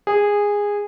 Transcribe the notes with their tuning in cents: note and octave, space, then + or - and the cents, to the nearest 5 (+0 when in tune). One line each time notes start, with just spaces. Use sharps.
G#4 -15